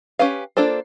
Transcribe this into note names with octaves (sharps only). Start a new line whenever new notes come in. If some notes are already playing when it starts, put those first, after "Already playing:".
C#4 G4 B4 F5
A#3 D4 F4 A4 C5